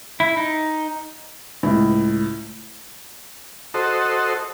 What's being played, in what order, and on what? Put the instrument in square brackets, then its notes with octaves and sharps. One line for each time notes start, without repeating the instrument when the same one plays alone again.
[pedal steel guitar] E4
D#4
[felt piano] C#2 A2
[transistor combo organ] F#4 A4 C5 D#5